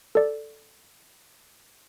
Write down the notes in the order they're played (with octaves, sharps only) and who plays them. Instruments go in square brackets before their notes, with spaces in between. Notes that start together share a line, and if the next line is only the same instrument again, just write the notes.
[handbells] A4 D5